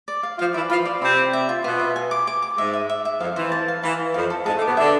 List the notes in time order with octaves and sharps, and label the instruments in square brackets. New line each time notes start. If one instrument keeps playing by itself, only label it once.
[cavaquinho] D5
F5
[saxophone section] F3 F4 [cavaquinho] F5
[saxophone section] E3 E4 [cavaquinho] D5
[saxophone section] F3 F4 [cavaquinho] B5
[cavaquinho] D5
[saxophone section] C3 C4 [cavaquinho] B5
[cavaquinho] D5
E5
F4
[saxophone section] B2 B3 [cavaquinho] F4
[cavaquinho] E5
G#5
D6
D6
D6
[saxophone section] G#2 G#3 [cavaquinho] E5
[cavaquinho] E5
E5
E5
[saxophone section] F2 F3 [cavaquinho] F5
[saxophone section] E3 [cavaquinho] C5
[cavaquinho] A5
F5
[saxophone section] E3 [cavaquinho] F5
[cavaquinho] F5
[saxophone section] F2 F3 [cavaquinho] F5
[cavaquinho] A4
[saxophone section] G#2 G#3 [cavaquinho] A5
[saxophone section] A2 A3
[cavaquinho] D6
[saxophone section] B2 B3
[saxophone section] D3 D4 [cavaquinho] E5